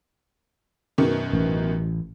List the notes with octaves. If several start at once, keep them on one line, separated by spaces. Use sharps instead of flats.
F#2 B2 D#3
A1